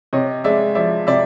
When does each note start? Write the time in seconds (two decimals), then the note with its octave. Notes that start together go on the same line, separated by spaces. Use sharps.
0.13 C3 C#5 D#5
0.44 G#3 D5 E5
0.75 F3 D5 E5
1.07 C3 D5 E5